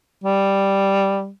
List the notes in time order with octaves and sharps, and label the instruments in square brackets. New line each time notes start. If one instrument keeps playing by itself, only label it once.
[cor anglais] G3